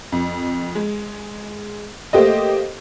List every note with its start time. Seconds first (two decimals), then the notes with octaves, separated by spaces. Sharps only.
0.12 F2
0.75 G#3
2.13 A3 A#3 G4 C5 D#5